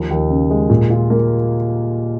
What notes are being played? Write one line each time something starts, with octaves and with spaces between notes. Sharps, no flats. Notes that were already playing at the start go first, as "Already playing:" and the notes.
Already playing: D#2 F3
D#2
C#3
G#3
A#2
F4
A#3